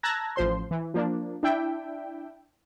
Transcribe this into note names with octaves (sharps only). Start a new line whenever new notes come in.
A5 A#5 E6 F#6 G#6 A#6
A1 F3 C5 C6
E3
F3 A#3 D4
D4 E4 E5 G5